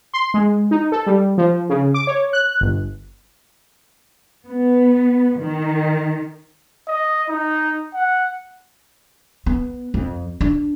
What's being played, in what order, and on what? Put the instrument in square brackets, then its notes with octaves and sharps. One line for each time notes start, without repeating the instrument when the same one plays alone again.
[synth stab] C6
G#3
D#4
A4
G3
F3
C#3
D6
C#5
F#6
G1
[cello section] B3
D#3
[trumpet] D#5
D#4
F#5
[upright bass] B3
F2
D4